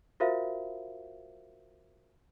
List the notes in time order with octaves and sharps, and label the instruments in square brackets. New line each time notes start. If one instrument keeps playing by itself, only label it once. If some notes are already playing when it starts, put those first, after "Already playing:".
[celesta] F4 F#4 A#4 C5 E5 F5